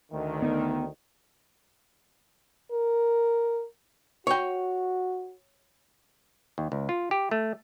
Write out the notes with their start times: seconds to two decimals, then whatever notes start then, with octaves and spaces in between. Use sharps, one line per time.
0.11 D2 D#3
0.42 B3 D#4 E5
2.72 A#4
4.27 F#4 C#5 G5
6.58 D#2
6.72 C#2
6.89 F4
7.11 G4
7.31 A3